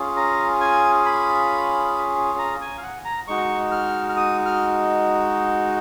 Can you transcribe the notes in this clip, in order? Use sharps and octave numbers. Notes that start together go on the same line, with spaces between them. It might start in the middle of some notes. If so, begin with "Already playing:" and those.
Already playing: C#4 F4 G#4
A#5
G#5
B5
A#5
G#5
F5
F#5
A#5
G#3 D#4 F#4 C#6
F6
F6
D#6
F6